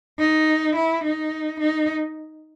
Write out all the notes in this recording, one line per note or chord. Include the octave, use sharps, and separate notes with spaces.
D#4
E4
D#4
D#4